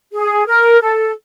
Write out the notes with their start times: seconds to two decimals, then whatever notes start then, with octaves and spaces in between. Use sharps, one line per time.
0.13 G#4
0.47 A#4
0.81 A4